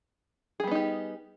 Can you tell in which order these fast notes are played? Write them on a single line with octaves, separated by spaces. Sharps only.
G#4 G3 B3 D#4 G4